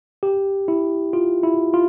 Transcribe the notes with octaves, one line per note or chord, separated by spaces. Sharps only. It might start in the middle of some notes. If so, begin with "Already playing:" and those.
G4
E4
F4
E4
F4